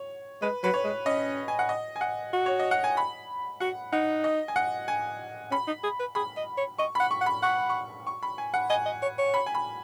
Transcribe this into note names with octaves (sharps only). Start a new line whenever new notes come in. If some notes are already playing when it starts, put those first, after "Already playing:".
Already playing: C#5
G#3 B4
F#3 B4
C#5
G#3
C#4 D#5
G#5
F#5
D#5
G#5
F#5
F#4
C#5
D#5
F#5
G#5
B5
F#4 F#5
D#4 F#5
D#5
G#5
F#5
G#5
C#4 B5
D#4
G#4
B4
G#4 B5
D#5
C#5
D#5 C#6
F#5 B5
C#6
F#5
B5
F#5 C#6
C#6
C#6
B5
G#5
F#5
D#5 G#5
D#5
C#5
C#5
B5
G#5
B5